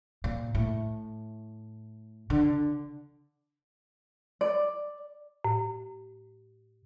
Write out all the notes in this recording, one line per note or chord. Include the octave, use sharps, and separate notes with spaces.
A#2
A2
D3
D5
A2